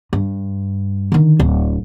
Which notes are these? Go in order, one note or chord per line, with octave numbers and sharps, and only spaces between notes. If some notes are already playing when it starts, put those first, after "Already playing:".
G2
D3 D#3
D1